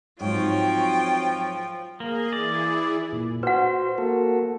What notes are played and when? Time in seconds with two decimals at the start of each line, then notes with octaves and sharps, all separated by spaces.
0.21 G#2 F3 F#3 C4 C#5 G5
2.00 A#3 G#4
2.33 E3 E4 G#4 D5
3.13 A#2
3.43 F#4 B4 C5 F#5
3.98 A#3 F#4 A4